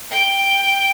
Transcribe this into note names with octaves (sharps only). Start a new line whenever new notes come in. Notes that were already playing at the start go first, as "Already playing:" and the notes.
G5